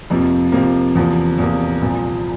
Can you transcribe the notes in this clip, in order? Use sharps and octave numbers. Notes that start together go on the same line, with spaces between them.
F2 C3 F3 A#3
F2 C3 F3 A#3
E2 C3 F3 A#3
E2 C3 F3 A#3
C2 A#2 F3